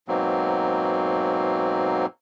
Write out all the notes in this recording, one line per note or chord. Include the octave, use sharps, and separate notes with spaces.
G#2 B2 F#3 A#3 C4